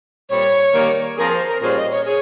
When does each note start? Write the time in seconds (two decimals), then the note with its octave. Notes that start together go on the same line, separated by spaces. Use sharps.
0.29 A#2 G3 C4 C#5
0.73 D#3 G3 A#3
1.17 F3 C4 F4 G#4 A#4
1.33 C5
1.48 A#4
1.62 A#2 G3 C#4 F4 G#4 C5
1.77 D#5
1.91 C#5
2.06 G#4 C#5